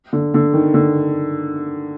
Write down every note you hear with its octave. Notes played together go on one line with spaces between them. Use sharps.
D3
D3
D#3
D3